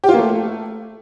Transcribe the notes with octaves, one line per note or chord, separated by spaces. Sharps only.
G4
F4
A#3
A3